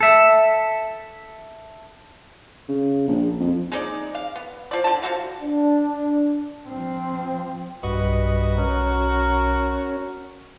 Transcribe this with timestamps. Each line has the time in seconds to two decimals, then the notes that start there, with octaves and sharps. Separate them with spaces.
0.01 A4 E5
2.68 C#3
3.08 A#1
3.40 F2
3.72 G#3 D#4 D5
4.15 F5
4.36 B3
4.71 F3 D5
4.84 D3 A5
5.02 F3 C#4 F#4 F5
5.42 D4
6.68 F3 C4
7.83 B1 G2 F#4 B4 D#5
8.58 C#4 A#4